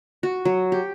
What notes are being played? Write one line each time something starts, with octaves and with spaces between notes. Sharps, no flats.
F#4
F#3
G4